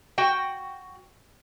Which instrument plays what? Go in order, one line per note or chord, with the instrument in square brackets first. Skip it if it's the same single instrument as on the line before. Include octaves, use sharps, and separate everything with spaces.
[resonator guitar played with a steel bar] F#4 G5